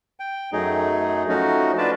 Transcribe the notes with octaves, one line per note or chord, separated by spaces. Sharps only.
G5
F#2 F#3 A3 D#4 G#4
F3 A3 C#4 D#4 F#4
D4 F4 B4 D5 A5